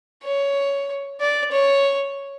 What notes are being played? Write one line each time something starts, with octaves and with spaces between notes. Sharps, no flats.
C#5
D5
C#5